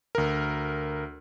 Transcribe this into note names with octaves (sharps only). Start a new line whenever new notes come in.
D2 A#4